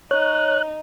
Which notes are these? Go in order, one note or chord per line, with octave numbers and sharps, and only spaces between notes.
D#4 C#5 F#6